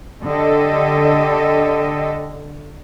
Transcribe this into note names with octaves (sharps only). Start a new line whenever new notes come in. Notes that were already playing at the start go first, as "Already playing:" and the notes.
D3 G4 A4 D#5